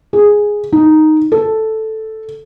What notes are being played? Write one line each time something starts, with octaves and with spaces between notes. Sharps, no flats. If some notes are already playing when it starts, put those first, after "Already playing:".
G#4
D#4
A4